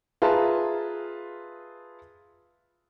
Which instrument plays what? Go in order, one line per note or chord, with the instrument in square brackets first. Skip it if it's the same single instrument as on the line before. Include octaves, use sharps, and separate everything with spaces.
[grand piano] F4 G#4 B4 E5 A5 A#5